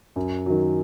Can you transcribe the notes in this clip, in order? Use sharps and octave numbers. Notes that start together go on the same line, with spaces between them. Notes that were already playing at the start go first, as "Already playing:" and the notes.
F#2
D#3 F#3